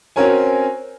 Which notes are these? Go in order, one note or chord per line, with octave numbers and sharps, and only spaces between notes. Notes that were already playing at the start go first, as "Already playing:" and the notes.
C4 C#4 F#4 A#4 C#5 G#5